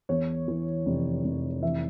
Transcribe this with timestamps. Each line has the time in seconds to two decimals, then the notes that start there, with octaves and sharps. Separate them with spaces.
0.09 E2 C#5
0.48 E3
0.86 F1
1.24 F1
1.62 E3 E5